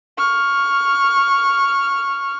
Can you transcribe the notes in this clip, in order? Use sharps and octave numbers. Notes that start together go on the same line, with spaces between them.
C#6 F6